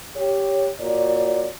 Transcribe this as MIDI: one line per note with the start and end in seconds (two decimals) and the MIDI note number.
0.16 0.70 67
0.16 0.70 73
0.80 1.49 46
0.80 1.49 66
0.80 1.49 73
0.80 1.49 74